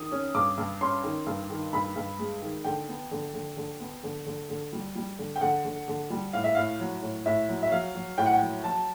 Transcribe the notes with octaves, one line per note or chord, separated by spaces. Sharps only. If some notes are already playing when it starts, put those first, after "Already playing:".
Already playing: D#3 D#6
C#4
G2 D6
G2
C#4 C6
D#3
G2
D#3
G2 B5
G2
G#3
D#3
D3 G5
B3
D3
D3
D3
B3
D3
D3
D3
G3
G3
D3
G5
D3 F#5
D3
D3
G3
A2 F5
E5
A2 F5
F#3
A2
A2 E5
F#3
E5
F#3 F5
F#3
A2 G5
F#5
G5
F#3
F#3 A5